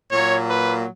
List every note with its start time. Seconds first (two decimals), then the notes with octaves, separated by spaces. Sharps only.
0.12 A#2 F#3 A#3 C#5
0.50 B4